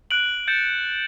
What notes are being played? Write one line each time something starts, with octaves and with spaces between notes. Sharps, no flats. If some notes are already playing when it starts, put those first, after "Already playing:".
F#6 D7 F#7
G6 A6 C#7 E7